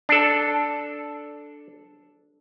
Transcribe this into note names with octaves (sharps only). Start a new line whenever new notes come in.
D4 A4